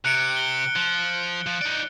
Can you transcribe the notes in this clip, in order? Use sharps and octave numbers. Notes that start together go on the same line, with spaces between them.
C3 F#6 C#7 D7
G7
F3
F3
D#4 D5